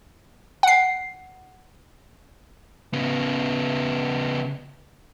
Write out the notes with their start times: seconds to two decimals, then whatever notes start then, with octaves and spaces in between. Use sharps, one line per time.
0.63 F#5 C7
2.93 C#3 B3